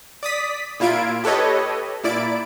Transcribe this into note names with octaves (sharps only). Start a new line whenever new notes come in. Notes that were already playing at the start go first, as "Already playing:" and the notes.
D5 D#6 B6
A#2 E4 F4 G#6 D7
G4 A4 B4 C#5 D#5
A#2 E4 D5 D7